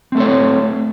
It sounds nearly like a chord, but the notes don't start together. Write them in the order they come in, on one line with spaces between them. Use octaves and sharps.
C4 A3 A4 C#5